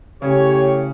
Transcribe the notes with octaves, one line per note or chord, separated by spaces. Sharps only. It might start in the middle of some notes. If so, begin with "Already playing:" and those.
A2 C#3 C#4 G4 C#5